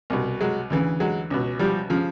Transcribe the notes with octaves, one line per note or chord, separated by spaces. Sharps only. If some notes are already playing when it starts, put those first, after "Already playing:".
C2 B2
F#3 G#3
D2 C#3 E3
F#3 G#3
C#2 B2
F3 G3
C#3 F3